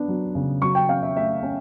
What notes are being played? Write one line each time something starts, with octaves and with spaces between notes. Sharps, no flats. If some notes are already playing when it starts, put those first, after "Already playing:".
Already playing: B3 D4
F#3
C#3
F#3 C#6
G5
C#4 F5
E5
A3 E5
C#4